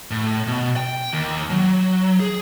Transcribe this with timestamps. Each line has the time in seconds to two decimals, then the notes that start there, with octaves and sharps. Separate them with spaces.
0.11 A2
0.47 B2
0.77 G5
1.13 D#2
1.50 F#3
2.20 G#4